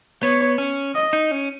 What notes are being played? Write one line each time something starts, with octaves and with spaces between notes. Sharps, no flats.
B3 C#5
C#4
D#5
D#4
C#4